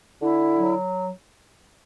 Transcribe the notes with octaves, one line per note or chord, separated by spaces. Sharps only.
D3 E4
F#3